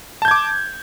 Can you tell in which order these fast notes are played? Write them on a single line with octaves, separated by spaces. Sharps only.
A5 G6 G#6 D6